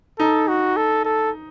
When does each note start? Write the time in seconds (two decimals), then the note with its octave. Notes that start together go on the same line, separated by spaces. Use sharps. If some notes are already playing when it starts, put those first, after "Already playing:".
0.19 D#4 A4
0.48 F#4
0.77 A4
1.05 A4